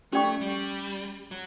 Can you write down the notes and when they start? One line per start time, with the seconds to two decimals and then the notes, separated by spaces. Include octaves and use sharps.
0.12 A3 C#4 G4 D5 G5 C#6
0.41 G3
1.31 F#3